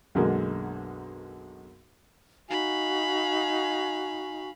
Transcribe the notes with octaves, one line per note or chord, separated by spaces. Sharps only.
B1 F#2 D3 G#3 A#3
D#4 F#4 F5 G#5 B5